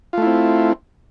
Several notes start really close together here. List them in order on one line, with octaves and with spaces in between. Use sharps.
F4 A3 E4 C4